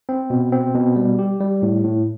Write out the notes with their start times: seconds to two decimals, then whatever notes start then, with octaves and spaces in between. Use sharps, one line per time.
0.09 C4
0.30 B2
0.52 C4
0.75 B2
0.96 G3
1.19 G4
1.40 G3
1.62 A2
1.84 A2